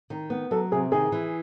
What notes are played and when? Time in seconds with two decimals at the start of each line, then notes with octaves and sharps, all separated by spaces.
0.10 D#3
0.30 B3
0.51 F#3 A4
0.72 C3 G#4
0.92 D#3 G#4
1.12 E3